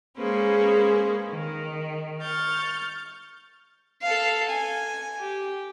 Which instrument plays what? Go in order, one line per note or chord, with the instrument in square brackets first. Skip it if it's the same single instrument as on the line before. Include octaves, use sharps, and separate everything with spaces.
[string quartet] G#3 A#3 C#4 G#4 B4 C5
D#3
C#6 F6 G6 A6
[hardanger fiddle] A4 F5
G#5
G4